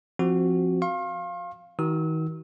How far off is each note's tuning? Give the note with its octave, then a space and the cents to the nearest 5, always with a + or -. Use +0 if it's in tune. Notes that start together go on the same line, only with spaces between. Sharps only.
F3 -5 C4 +15 F#4 +0
F5 +0 C6 +45
D#3 +40 F#4 +30 E6 -35